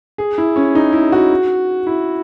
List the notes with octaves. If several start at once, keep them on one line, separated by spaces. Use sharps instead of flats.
G#4
E4
C#4
D#4
E4
F#4
E4